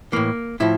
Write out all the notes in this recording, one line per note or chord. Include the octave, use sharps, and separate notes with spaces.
A2 E3 A#3
A2 F3 E4